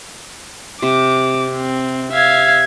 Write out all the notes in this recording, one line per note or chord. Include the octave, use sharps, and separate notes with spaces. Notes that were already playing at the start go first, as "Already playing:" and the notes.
C3 D6
C4
E5 F5 G#6